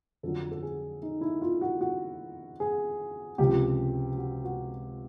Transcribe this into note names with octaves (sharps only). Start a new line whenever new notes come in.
F2 D3 F#3 A4
A4
G#4
D#4
E4
F4
F#4
F#4
G#4
C#2 C3 F3 G4
F#4
F#4